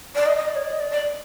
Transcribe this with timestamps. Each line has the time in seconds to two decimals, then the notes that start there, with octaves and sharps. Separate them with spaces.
0.15 D5
0.26 D#5
0.37 D#5
0.48 D5
0.55 C#5
0.64 D5
0.72 D#5
0.80 D5
0.91 D5